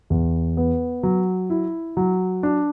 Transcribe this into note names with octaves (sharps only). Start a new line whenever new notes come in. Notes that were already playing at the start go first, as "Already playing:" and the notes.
E2
B3
F#3
E4
F#3
D4